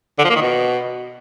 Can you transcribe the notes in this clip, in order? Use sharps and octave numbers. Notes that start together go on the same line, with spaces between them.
D3
F3
A#3
D#3
B2